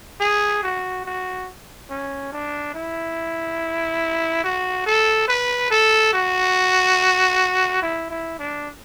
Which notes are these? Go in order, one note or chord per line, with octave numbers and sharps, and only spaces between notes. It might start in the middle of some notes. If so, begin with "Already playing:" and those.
G#4
F#4
F#4
C#4
D4
E4
F#4
A4
B4
A4
F#4
E4
E4
D4